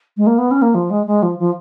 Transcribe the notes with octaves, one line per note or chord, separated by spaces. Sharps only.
G#3
A#3
B3
C#4
A#3
F3
G#3
G#3
F3
F3